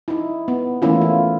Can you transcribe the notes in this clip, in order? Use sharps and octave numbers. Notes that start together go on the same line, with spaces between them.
D#4 E4
B3
E3 A3 A#3 C#4 E4 F4
F4